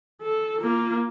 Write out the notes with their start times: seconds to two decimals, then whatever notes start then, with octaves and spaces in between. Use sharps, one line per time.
0.22 A4
0.61 A#3 F4